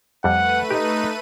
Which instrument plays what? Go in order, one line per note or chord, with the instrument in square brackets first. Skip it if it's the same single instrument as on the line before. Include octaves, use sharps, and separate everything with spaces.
[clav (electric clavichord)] F2 G3 [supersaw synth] A3 B4 D#7 [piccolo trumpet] F#5
[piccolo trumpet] D#4 [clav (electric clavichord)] G4 D#5